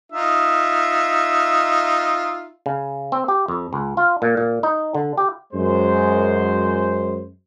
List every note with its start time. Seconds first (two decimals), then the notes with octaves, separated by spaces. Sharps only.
0.12 D#4 F4 E5
2.66 C#3
3.12 C4
3.28 G4
3.48 F2
3.73 C#2
3.97 F4
4.22 A#2
4.37 A#2
4.63 D#4
4.95 D3
5.17 G4
5.54 F#2 G#3 C5